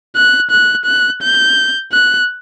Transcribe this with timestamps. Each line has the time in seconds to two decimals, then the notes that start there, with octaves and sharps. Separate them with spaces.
0.16 F#6
0.51 F#6
0.86 F#6
1.22 G6
1.93 F#6